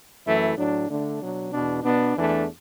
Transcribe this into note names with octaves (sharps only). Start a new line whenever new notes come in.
F#2 E3 A3 E4
A2 F#3 D4
D3 A3 D4
B2 F#3 D4
E2 B2 B3 D4
B2 B3 D4
E2 E3 A3 D4